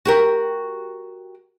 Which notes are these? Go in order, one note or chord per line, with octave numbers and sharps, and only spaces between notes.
F#4 G4 A#4